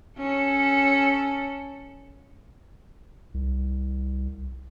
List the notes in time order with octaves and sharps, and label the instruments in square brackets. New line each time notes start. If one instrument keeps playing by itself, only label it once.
[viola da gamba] C#4 A4
[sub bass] C2